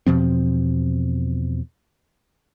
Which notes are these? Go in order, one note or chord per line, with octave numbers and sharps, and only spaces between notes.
E2 B2 F3 C4